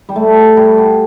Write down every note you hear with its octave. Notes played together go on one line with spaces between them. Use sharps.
G3
A3
G3
F#4